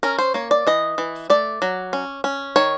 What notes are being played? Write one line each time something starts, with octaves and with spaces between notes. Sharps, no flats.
C#4 A#4
C5
A#3 C#5
D5
E3 D#5
E3
A3 D5
F#3
C#4
C#4
D#3 C#5